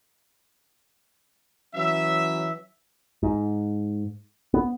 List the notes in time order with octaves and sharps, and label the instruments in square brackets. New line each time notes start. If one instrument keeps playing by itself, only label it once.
[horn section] E3 F#3 C#4 E5
[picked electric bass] G#2
B3